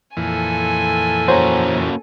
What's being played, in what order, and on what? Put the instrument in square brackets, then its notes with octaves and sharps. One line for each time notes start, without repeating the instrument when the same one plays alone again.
[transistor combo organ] F2 A#2 E3 [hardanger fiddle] A4 G#5
[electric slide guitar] A#3 C#4 F#4 [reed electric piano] C5 C#5 A#5